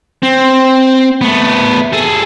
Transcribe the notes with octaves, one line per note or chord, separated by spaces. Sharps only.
C4
A3 B3
G#4 A4